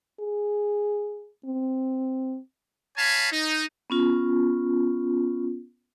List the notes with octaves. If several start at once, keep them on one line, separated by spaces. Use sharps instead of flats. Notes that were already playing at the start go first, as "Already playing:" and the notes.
G#4
C4
C#5 F5 G#5 A5 B5
D#4
B3 C#4 F4